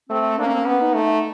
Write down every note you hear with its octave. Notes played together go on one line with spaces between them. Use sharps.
A3 C4
A#3 D4
C#4
C4
C#4
B3
D#4
A3